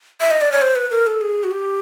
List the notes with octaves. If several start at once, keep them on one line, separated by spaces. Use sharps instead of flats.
E5
D#5
D5
C#5
C5
B4
A#4
A4
G#4
F#4
G4